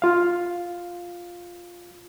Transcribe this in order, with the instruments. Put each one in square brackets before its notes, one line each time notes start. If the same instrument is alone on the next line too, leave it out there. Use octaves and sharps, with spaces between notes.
[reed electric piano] F4 F5